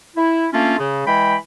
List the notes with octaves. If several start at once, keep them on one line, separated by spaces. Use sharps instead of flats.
E4
A3 A#3 C#4 D4 F4
C#3
E3 G#3 G5 B5